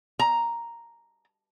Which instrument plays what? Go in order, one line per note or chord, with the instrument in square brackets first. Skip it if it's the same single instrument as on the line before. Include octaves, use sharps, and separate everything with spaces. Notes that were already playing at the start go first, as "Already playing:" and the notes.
[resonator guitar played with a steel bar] A#5